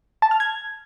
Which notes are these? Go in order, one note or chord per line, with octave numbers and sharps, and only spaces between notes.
A5
F6
G#6